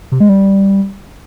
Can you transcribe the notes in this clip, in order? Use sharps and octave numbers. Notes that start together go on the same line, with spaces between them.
C3
G#3
G3